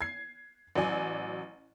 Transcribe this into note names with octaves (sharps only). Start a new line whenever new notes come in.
G#6 C7
A1 F#3 D5 G#5